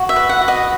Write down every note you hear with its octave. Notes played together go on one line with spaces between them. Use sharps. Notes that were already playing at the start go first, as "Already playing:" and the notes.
Already playing: F#4
E5
B4
F#5
F#4
D#5